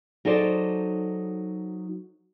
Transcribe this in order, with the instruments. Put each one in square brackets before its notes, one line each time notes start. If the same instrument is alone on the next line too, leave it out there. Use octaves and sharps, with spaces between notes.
[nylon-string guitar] F#3 D#4 G#4 A4 C5 D5